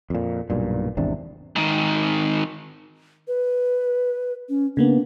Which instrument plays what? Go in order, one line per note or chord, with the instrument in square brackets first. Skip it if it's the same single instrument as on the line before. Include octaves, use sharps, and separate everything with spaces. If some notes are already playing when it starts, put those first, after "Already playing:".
[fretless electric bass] F2 A#2
B1 G2 A#2
G#1 E2 C3 D4
[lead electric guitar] G#2 D#3
[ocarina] B4
C#4
[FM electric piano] C#3 A#3 B3 [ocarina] D4